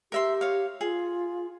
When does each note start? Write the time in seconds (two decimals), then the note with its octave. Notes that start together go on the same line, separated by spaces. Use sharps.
0.12 G4 A#4 E5 C6
0.41 C#5 F5
0.81 F4 G#4